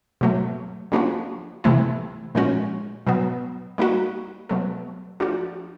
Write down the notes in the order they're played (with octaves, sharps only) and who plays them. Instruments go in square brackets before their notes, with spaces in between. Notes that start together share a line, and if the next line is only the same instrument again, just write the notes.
[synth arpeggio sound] B2 F#3 A3
C#3 F3 A#3 D4 F#4
C3 E3 A3 C4 E4
A#2 F3 G#3 C#4 F#4
B2 F#3 B3
G3 A#3 D#4 F#4
B2 F#3 A3
F3 A3 D4 F#4